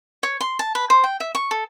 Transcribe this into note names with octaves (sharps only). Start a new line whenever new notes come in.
C#5
C6
A5
B4
C5
G5
E5
C#6
A4